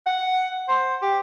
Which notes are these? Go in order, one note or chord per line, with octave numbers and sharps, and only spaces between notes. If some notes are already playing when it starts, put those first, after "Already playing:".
F#5
C5
G4